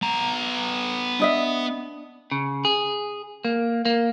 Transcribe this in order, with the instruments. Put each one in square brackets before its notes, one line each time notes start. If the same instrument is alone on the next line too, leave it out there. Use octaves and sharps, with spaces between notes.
[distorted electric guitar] B3 A#5
[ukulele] D4 D#5 E5
[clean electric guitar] C#3
G#4
A#3
A#3